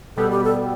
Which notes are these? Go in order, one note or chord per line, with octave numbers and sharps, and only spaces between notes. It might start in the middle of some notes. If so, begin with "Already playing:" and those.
B2 G3 B3 A4
G4
A4